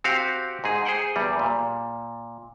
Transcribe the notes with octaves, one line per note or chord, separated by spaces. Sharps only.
C4 F#4 G4 F5
G#2 D#4 G#4
G#4 C5 F#5 G5
E2 G3
A#2